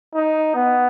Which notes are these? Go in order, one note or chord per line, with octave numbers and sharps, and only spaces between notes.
D#4
B3